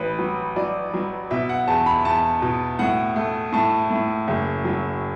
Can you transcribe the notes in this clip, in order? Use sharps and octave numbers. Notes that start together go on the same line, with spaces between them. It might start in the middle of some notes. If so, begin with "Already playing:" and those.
Already playing: A1 B4
F#3
F#3 D5
F#3
B2 E5
F#5
E2 A5
B5
E2 A5
B2
A2 F#5
A3
A2 A5
A2
F#1
F#3